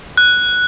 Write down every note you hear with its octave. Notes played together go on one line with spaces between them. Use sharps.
F#6